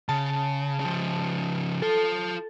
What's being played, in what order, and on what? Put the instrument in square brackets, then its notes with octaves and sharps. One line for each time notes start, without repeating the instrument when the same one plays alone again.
[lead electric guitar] C#3 [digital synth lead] A5
[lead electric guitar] C#3 F3
[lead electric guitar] F4 A5 [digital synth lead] A4